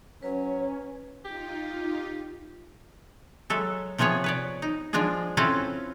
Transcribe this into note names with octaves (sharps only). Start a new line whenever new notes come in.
F#3 C#4 B4 C#5
D#4 F4 G4
F#3 G#3 A4 E5
C3 F3 B3 G#4 C#5
B4 C#5 D5
D#4
F3 G#3 D4 F4 G#4
C4 C#4 E4 F4 A4 B4